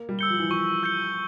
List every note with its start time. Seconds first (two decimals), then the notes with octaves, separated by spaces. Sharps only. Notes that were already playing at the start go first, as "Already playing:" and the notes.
Already playing: A#3
0.09 G3
0.19 E6 G6 C#7 G7
0.30 F3
0.39 E3
0.49 F3 C#6
0.83 E6 G6 C#7 G7